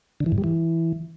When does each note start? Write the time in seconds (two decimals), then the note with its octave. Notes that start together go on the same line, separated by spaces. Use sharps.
0.20 D3
0.26 E3
0.32 G2
0.38 G3
0.44 E3